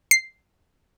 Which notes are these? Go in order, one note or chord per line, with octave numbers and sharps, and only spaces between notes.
C7